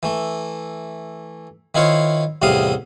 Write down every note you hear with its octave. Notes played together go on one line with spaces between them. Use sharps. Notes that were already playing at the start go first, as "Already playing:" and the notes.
E3 A3
D#3 E4 F4 C5 C#5
E2 A2 C3 G3 F5 D#6